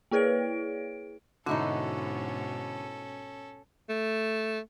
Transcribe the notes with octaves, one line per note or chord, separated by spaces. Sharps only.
A#3 E4 G#4 B4 C#5 D7
G#2 B2 D3 C#4 D#4 E4 F#4 A4
A3